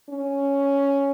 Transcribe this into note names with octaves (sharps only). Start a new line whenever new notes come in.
C#4